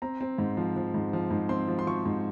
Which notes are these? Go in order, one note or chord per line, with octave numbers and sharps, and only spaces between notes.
C4 A#5
C4
G#2
F3
F3
G#2
F3
G#2
C4 C6
F3
C6
F3 C#6
G#2